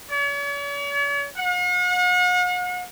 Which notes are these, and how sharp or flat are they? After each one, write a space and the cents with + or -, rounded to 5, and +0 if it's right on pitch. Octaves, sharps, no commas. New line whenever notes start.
C#5 +45
F#5 -45